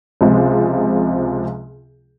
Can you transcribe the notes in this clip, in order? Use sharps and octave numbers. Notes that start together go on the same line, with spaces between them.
C#2 C3 F3 G#3